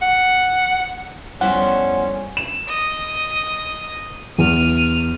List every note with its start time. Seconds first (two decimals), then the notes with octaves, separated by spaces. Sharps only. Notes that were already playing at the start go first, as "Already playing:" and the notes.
0.02 F#5
1.41 F2 G3 B3 C#4 E4 C5 F#5 E7
2.37 E7
2.68 D#5
4.38 E2 F6 D#7